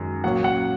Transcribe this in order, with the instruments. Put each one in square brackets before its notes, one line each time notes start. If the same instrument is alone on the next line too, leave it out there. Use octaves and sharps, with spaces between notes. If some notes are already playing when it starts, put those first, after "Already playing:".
Already playing: [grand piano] F#2 D#3 G#3
A#2 F#3 A#3 C#4 F#5
F#5